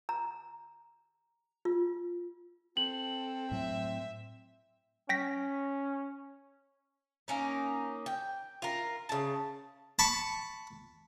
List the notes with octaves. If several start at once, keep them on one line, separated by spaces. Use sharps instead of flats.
A#5
F4
C4 A4 F#7
A2 F#3 E5
C#4 G5 A#6 B6
A#3 C#4 D#4
G5
F4 A#4
C#3 A5
A5 B5 C#6